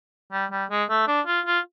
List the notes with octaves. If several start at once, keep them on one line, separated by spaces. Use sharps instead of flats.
G3
G3
G#3
A3
D4
F4
F4